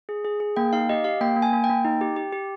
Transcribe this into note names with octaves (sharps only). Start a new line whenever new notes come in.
G#4
G#4
G#4
A#3 G5
D#4 F5
G4 D#5
G4 F5
A#3 G5
A#3
G#5
A#3
G5
A#3
D#4
G4
G4
G4